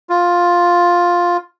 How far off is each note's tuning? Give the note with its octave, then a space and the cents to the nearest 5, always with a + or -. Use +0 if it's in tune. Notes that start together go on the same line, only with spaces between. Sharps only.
F4 +5